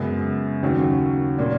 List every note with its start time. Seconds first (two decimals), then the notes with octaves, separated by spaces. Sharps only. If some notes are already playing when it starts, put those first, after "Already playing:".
Already playing: F#2 C#3 G#3 B3
0.63 D#2 C#3 F#3
1.38 A#2 A#3 C#4